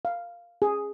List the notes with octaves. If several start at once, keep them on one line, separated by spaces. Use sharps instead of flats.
F5
G#4